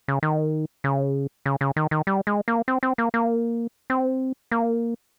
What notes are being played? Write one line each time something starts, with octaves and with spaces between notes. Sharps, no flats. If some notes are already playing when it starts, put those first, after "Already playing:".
C#3
D#3
C#3
C#3
C#3
D#3
D#3
G3
G#3
A#3
C4
C4
A#3
A#3
C4
A#3